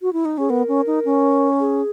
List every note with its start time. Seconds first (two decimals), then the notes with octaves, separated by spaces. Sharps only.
0.00 F#4
0.13 E4
0.25 D#4
0.38 C#4 G#4
0.49 B3 A#4
0.68 C#4
0.87 D#4
1.05 C#4
1.60 G#4